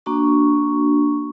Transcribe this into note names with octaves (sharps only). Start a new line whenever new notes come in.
A#3 D4 F#4 C#6